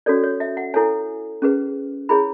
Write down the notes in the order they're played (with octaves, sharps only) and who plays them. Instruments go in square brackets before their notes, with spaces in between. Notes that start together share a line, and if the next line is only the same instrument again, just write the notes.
[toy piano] C#4 F#4 A4 C#5 D5
C#5
E5
F#5
E4 A4 C#5 G#5
C#4 G#4 B4
E4 G#4 C#5 B5